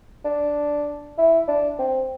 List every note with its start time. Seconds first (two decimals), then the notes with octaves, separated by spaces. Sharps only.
0.25 D4
1.18 E4
1.48 D4
1.79 C4